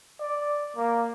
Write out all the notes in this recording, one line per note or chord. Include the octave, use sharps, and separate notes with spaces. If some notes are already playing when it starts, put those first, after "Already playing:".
D5
A#3